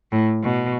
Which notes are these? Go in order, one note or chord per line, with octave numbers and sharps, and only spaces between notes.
A2
B2